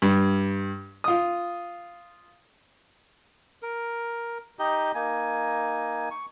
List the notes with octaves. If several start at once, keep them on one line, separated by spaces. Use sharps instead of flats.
G2
F4 D#6
A#4
D#4 G4 D#5
A#3 D#4 G#5
C#6